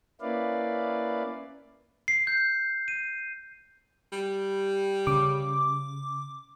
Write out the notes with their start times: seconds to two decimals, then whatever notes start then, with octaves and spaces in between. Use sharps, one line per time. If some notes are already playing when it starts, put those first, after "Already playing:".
0.21 A#3 C#4 E4 B4 D5 F5
2.08 C7
2.27 G6
2.88 D#7
4.12 G3
5.07 C#3 D6